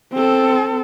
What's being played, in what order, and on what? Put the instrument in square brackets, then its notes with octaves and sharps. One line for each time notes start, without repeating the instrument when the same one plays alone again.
[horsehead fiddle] C4 A4